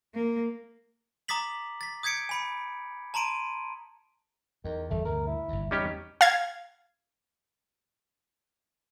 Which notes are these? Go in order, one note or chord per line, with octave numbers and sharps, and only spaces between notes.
A#3
A#5 D6 D#6 A6 B6 F#7
A6 B6
D#6 G6 G#6 B6 C#7 D7
G#5 B5 C#7
A5 A#5 C6 D7 D#7
E2 D#3
G1 E2 G3 A3
D2 G2 B2 A#4
E4
G1 D#2
E2 G3 C#4 D#4 G4
F5 G#6